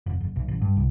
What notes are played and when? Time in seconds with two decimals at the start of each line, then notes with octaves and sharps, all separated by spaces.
0.06 F1
0.21 F#1
0.36 B1
0.48 A1
0.61 G2
0.76 C2